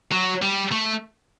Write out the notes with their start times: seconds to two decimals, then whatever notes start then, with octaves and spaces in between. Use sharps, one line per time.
0.12 F#3
0.42 G3
0.72 A3